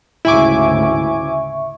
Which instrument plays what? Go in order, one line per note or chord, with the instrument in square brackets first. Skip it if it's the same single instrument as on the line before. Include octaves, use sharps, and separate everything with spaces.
[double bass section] D2 G#2 C#3 [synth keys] E4 G#5 D6 [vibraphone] E5 C#6